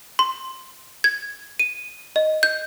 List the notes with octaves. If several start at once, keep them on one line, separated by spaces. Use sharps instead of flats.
C6
G#6
D#7
D#5
G6